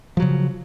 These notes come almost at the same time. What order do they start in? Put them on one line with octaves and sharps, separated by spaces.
F3 F#3 C#3